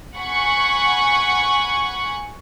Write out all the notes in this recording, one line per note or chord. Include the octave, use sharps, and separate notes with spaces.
F#5 G#5 B5 C#6